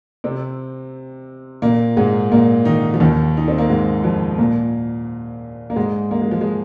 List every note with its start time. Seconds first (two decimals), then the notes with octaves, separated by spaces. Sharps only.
0.24 C3 C4
1.62 A#2 A#3
1.96 G#2 G#3
2.31 A#2 A#3
2.65 D#3 D#4
2.94 F3
3.00 D#2 D#3
3.37 D#4
3.48 C4
3.58 A#3
3.69 G#2 G#3
4.04 F2 F3
4.38 A#2 A#3
5.70 A#3
5.76 G#2 G#3
6.11 A#3
6.21 G#3
6.31 F3
6.41 G#3